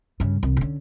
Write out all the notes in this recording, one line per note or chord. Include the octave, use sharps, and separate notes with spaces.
G2 C#3
C2 E3
D3 C#4